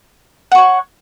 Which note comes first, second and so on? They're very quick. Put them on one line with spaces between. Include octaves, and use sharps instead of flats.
F#5 C#6 C#5